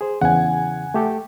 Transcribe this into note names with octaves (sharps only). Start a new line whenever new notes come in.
G#4 C5
E2 C#3 F#5 G#5
A3 G4 A4